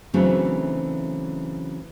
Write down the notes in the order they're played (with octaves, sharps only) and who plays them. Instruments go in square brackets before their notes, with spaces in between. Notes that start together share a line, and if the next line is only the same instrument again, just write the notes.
[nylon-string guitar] C#3 E3 F#3 A3 C4 D4